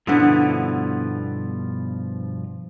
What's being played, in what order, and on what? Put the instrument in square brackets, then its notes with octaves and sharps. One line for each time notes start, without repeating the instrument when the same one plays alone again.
[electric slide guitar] G2 B2 F3 [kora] D3 B3 E4